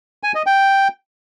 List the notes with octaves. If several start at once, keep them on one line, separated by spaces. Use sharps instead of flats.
G#5
D#5
G5